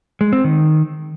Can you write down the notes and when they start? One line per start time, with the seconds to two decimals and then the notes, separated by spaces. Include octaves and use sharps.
0.21 G#3
0.33 C4
0.44 D#3